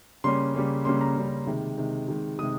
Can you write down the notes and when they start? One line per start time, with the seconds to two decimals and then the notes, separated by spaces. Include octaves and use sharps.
0.24 C#3 G3 A#3 C#4 C6
0.55 C#3 G3 A#3 C#4
0.85 C#3 G3 A#3 C#4 C6
1.01 A#5
1.16 C#3 G3 A#3 C#4
1.46 C3 D#3 G#3
1.78 C3 D#3 G#3
2.08 C3 D#3 G#3
2.39 C3 D#3 G#3 D#6